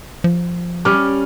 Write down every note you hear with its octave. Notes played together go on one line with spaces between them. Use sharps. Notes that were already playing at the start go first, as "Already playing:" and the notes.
F3
G3 C#4 D6 F6